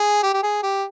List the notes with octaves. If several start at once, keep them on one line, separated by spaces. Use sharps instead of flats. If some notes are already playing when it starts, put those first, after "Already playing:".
Already playing: G#4
G4
G4
G#4
G4